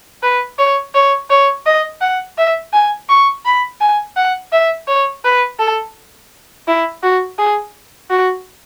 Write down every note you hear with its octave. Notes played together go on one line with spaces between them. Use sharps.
B4
C#5
C#5
C#5
D#5
F#5
E5
G#5
C#6
B5
G#5
F#5
E5
C#5
B4
A4
E4
F#4
G#4
F#4